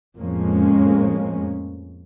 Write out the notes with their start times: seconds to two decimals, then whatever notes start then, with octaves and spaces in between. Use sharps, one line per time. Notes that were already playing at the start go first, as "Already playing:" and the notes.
0.17 F2 A2 F3 G#3 A#3 C#4